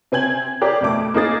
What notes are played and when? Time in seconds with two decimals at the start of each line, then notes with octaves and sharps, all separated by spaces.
0.12 C3 C4 G#5 G#6 F#7
0.62 G4 G#4 A#4 D5
0.81 F2 B2 A3 D6
1.14 A#3 D#4 G#4 A6